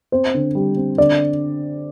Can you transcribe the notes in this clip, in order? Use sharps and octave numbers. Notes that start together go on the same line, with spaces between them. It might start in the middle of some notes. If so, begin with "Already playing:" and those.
C4 C5
D3
G3
C4
D3 D5